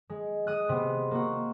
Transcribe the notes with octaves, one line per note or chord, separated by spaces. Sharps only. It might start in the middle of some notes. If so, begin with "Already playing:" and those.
G#3
G#3 D#6 F#6
C3 B3
A#3 F#4